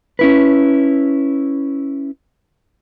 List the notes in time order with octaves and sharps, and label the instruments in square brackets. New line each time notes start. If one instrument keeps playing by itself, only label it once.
[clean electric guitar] C#4 E4 B4